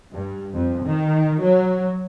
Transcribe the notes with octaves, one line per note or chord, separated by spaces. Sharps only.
G2
F2
D#3
F#3